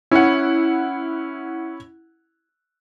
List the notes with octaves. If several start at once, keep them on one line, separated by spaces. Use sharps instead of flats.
C#4 E4 F#5